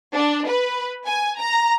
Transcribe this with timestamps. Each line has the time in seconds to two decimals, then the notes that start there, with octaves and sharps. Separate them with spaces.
0.14 D4
0.47 B4
1.06 G#5
1.40 A#5